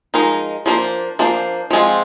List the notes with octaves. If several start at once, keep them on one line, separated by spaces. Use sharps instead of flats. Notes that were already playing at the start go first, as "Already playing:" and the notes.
F3 G#3 D#4 A#4
F3 A#3 D4 F4 C5
F3 A#3 D4 F4 C5
F3 G#3 C4 F4